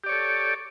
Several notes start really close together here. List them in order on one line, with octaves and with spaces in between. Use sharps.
G4 D5 C#5 A4